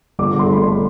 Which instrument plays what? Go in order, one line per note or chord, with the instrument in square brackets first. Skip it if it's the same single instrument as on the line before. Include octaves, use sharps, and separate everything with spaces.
[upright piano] G1 D6
D3
C6
A3 B5
C6